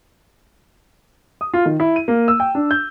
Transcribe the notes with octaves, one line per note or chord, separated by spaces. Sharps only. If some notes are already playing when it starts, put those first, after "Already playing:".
D#6
F4
D#3
E4
D#7
A#3
E6
G5
D4
G6